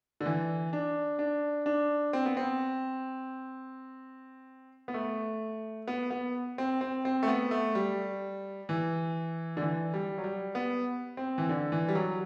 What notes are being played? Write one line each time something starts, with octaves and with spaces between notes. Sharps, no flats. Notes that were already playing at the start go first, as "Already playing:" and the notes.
D3
E3
D4
D4
D4
C4
B3
C4
B3
A3
B3
B3
C4
C4
C4
A3
B3
A3
G3
E3
D3
E3
G3
F#3
G3
B3
C4
E3
D3
E3
G3
F#3